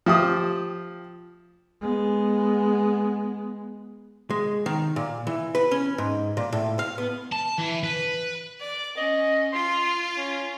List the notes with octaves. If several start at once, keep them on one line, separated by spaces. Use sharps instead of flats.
F3 G4 D#6
G#3 B3
G#3
D#3
A#2
E3
B4
C#4
G#2
A#2
A2
F5
B3
A5
E3
B4
D5
C#4 D#5
F4 C6
C#4